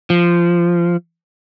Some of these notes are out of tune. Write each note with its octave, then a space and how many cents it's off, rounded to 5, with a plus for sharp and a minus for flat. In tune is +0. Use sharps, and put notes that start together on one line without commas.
F3 -15